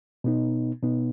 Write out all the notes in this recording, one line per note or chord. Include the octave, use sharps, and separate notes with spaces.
B2 B3 D#4
B2 B3 D#4